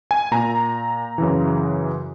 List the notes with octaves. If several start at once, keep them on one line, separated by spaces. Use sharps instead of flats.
G#5
A#2 A#5
F#2 C#3 E3